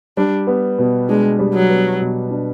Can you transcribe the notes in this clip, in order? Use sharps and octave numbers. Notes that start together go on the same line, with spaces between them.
G3 D4
B3
B2
G#3 D4
G3
F#3
B3
B2
D4